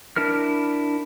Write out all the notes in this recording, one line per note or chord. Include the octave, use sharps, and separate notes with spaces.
D4 E4 A#4 F6